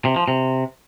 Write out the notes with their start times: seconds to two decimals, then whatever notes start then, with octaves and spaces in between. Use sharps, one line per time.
0.05 C3
0.16 F3
0.28 C3